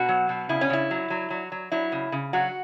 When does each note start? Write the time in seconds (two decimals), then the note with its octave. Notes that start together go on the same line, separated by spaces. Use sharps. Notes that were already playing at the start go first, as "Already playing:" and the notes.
Already playing: B2 F#4
0.09 F#3
0.29 B2
0.49 C#3 E4
0.61 C#4
0.70 C#3 E4
0.91 F#3
1.10 F#3
1.30 F#3
1.52 F#3
1.72 F#3 E4
1.92 C#3
2.12 C#3
2.33 F#3 F#4